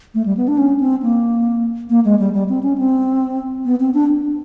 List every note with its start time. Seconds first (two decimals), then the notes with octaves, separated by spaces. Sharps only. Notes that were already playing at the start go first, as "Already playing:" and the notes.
0.14 A3
0.26 G3
0.37 B3
0.48 D4
0.58 C#4
0.80 C4
1.02 A#3
1.90 A#3
2.05 G#3
2.19 G3
2.33 G3
2.49 C4
2.63 C#4
2.78 C4
3.65 B3
3.80 C4
3.94 D4